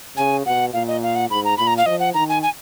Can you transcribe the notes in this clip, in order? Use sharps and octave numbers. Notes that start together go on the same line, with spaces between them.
C#3 G#5
B2 F#5
A#2 F5
D#5
F5
F#5
G#2 B5
A#5
A#2 B5
A#5
F5
F3 D#5
F#5
D#3 A#5
G#5
G#5